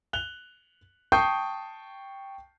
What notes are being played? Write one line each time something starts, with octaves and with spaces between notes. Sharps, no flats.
F#6 F7 G7
G5 A5 C#6 D#6 G6 C7